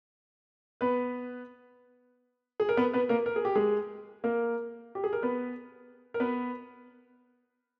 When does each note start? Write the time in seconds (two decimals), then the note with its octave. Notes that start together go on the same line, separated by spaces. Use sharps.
0.81 B3 B4
2.60 G#4
2.69 A#4
2.77 B3 B4
2.93 B3 B4
3.09 A#3 A#4
3.26 A#4
3.36 G#4
3.45 G4
3.55 G#3 G#4
4.24 A#3 A#4
4.95 G4
5.04 G#4
5.13 A#4
5.22 B3 B4
6.14 A#4
6.20 B3 B4